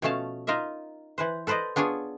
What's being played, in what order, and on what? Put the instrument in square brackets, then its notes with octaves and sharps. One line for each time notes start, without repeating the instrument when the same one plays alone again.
[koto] B2 F3 A3 C#4 F5 A5
D#4 F4 A#4 D#5 E5
E3 B4 C5
A4 B4 C5 D5 D#5
B3 D4 F4 G#4 C#5